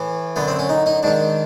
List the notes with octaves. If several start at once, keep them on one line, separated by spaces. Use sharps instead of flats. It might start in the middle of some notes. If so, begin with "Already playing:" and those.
Already playing: A2 E3
F#2 D3 B3
C4
C#4
D#4
D#4
G#2 D#3 D4